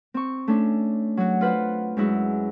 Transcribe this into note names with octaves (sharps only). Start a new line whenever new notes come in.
C4 C#6
A3 C#4 D4
F#3 F#4
F4 B4 C5 F#5
F#2 G#3 E4 F#4